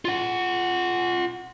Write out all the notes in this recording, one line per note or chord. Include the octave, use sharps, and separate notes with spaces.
F4 F#5